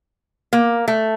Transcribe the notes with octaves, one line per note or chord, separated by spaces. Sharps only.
A#3
A3